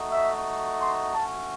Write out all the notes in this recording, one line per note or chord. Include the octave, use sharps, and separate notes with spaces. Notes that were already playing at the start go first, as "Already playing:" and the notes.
Already playing: A3 D#4 F#4
E5
C6
A3 C#4 F#4 A5